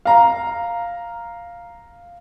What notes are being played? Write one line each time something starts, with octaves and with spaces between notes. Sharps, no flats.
F5 A#5